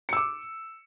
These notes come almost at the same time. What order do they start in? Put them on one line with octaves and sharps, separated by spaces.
C#7 E6 D6